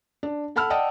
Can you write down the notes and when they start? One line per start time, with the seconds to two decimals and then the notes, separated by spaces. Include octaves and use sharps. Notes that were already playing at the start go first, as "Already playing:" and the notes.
0.23 D4
0.56 A4 F#5 A5 B5 E6 F6
0.70 D5 D#5 F#5 G5 A5 D#6